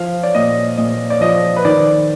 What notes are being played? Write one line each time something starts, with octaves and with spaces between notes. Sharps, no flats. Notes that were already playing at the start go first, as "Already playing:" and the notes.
Already playing: F3 F5
D5
A#2 D#5
A#2 D#5
D5
F3 D#5
B4
D#3 D5